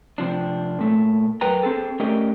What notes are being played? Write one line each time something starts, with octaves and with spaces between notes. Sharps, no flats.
C3 F3 D4
A#2 A3
F#2 A#4 B4 G5 A#5
C4 G#4 A4
A3 C#4 G4 A#4 D5 D#5